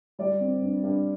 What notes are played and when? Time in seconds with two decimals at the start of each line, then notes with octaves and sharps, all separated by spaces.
0.19 G3 D5
0.40 C4
0.62 G2
0.83 G2